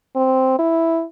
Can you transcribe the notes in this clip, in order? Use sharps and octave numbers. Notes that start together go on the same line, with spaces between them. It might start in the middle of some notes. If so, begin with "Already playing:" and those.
C4
E4